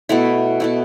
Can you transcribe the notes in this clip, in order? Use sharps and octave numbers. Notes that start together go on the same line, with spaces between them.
B2 A3 E4
B2 A3 E4